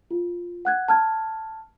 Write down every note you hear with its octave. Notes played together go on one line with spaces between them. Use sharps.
F4
F#5 F#6 G#6
A5 F6 G#6